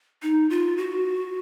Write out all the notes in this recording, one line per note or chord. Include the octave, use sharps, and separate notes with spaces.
D#4
F4
F#4